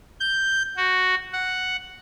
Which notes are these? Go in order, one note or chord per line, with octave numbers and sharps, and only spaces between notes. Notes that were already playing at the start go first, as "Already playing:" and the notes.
G6
F#4
F#5